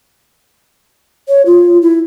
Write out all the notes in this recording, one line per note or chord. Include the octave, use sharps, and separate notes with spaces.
C#5
F4
E4